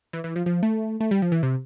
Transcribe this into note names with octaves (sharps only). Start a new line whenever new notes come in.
E3
E3
F3
F3
A3
A3
G3
F3
E3
C3